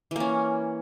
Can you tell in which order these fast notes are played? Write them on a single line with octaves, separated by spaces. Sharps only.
E3 A#3 C#4